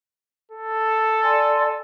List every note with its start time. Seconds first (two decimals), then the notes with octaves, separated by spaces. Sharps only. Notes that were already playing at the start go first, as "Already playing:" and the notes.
0.51 A4
1.23 D5 G#5 C6